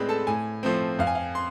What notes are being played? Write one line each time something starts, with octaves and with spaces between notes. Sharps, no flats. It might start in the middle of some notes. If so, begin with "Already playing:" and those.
Already playing: A2 G#3 C4 B4 C5 D5 B5
A4 A5
A2 G#5
F3 A3 C4
F2 F5
G#5
F5
C6